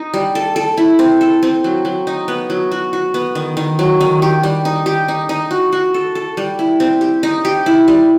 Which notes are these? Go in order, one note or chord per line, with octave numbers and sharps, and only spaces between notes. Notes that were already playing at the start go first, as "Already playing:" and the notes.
Already playing: D#4
G3
A4
A4
E4
C4
A4
C4
F#3
F#3
D#4
B3
F#3
F#4
F#4
B3
D#3
D#3
F#3
D#3
G4
G3
D#4
G4
D#4
D#4
F#4
F#4
A4
A4
G3
E4
C4
G4
D#4
G4
E4
G3